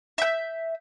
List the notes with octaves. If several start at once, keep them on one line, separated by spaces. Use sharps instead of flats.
E5 G6